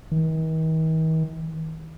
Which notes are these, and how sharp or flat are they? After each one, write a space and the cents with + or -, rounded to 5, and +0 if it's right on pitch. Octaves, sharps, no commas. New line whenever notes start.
D#3 +45